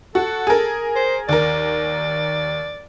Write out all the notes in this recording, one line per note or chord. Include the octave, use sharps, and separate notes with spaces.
F#4 A4
G#4 A#4
C5
D#2 A#4 D5